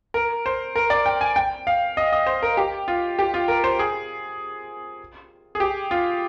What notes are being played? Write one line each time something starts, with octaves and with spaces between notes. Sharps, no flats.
A#4
C5
A#4
D5
G5
G#5
G5
F5
D#5
D#5
C5
A#4
G4
F4
G4
F4
A#4
C5
G#4
G#4
G4
F4